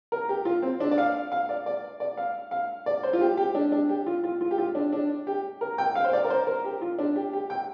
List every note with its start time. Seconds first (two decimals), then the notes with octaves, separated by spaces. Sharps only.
0.12 A#4
0.29 G4
0.45 F4
0.62 C4
0.80 D4
0.91 D5
0.98 F5
1.32 F5
1.49 D5
1.66 D5
2.00 D5
2.17 F5
2.51 F5
2.86 D5
3.03 C5
3.13 F4
3.21 G4
3.37 G4
3.55 D4
3.72 D4
3.89 G4
4.06 F4
4.23 F4
4.41 F4
4.51 G4
4.58 F4
4.75 D4
4.92 D4
5.27 G4
5.61 A#4
5.78 G5
5.95 F5
6.04 C5
6.13 D5
6.24 A#4
6.30 C5
6.47 A#4
6.64 G4
6.81 F4
6.99 D4
7.16 G4
7.33 G4
7.50 G5